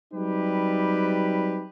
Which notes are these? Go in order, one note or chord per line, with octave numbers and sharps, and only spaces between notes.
F#3 G3 C4 D#4 G4 B4